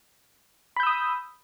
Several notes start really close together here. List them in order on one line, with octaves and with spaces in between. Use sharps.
B5 G6 E6 D#6